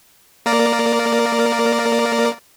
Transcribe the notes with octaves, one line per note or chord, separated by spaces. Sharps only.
A#3 A#4 D5